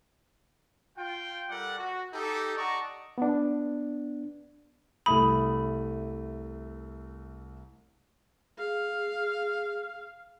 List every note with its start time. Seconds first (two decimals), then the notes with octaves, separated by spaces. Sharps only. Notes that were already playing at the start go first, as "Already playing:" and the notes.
0.98 F4 G5
1.50 G3 A4 A#4 D5 F#5
1.79 F#4
2.14 D#4 G4 A4
2.57 D5 D#5 F#5 A5 A#5 C#6
3.18 B3 D4
5.06 C2 A3 B5 D#6
8.58 G#4 F5